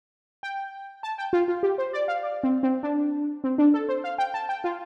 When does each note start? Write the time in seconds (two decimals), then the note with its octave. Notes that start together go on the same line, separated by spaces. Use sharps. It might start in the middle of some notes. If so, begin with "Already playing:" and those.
0.43 G5
1.03 A5
1.18 G5
1.33 F4
1.48 F4
1.63 G4
1.78 C5
1.93 D5
2.08 F5
2.23 D5
2.43 C4
2.63 C4
2.83 D4
3.44 C4
3.58 D4
3.74 A4
3.89 C5
4.04 F5
4.18 G5
4.34 A5
4.49 G5
4.64 F4